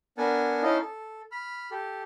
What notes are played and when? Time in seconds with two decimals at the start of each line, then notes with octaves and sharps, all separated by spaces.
0.18 B3 D4 A#4 F#5 G#5 A5
0.63 C#4 D#4 E4 D#5 F5 A5
0.82 A4
1.32 B5 F6
1.71 G4 A4